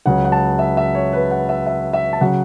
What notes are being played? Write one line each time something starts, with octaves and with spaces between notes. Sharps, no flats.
C#2 C#3 F#3 F#5
F#5
A5
E5
E5
C#5
B4
F#5
E5
E5
E5
A5
C#3 F#3 F#5